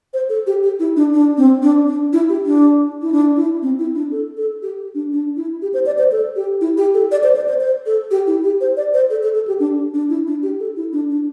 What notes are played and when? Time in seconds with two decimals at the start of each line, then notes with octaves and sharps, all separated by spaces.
0.14 C5
0.29 A4
0.47 G4
0.63 G4
0.80 E4
0.96 D4
1.14 D4
1.37 C4
1.63 D4
1.88 D4
2.13 E4
2.29 G4
2.46 D4
3.02 E4
3.12 D4
3.37 E4
3.63 C4
3.79 E4
3.95 D4
4.12 A4
4.37 A4
4.62 G4
4.95 D4
5.12 D4
5.37 E4
5.62 G4
5.74 C5
5.86 D5
5.98 C5
6.12 A4
6.36 G4
6.61 E4
6.77 G4
6.94 A4
7.11 D5
7.23 C5
7.36 D5
7.48 C5
7.61 C5
7.86 A4
8.11 G4
8.27 E4
8.44 G4
8.61 C5
8.77 D5
8.94 C5
9.10 A4
9.23 A4
9.35 A4
9.48 G4
9.60 D4
9.94 D4
10.09 E4
10.27 D4
10.43 G4
10.60 A4
10.77 E4
10.93 D4
11.10 D4